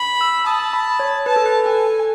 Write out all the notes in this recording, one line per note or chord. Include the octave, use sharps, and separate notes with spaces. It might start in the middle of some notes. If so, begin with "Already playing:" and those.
Already playing: B5
E6
A5 D#6
B5
C#5
B4 A5
A4
B4
A4 G#5